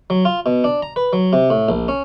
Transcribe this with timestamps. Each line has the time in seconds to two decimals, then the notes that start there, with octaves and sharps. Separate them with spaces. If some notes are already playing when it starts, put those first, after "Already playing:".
0.10 F#3
0.25 F4
0.46 B2
0.64 D4
0.82 A#5
0.96 B4
1.13 F#3
1.33 C3
1.50 A2
1.69 A#1
1.88 C#4